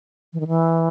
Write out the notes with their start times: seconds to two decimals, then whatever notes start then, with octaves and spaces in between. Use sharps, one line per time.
0.33 E3
0.40 D#3
0.47 E3